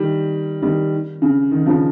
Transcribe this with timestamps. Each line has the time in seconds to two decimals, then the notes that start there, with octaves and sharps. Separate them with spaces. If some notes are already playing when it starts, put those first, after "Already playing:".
Already playing: D#3 G3
0.62 D#3 G3
1.22 C#3
1.51 D#3
1.66 C#3 F3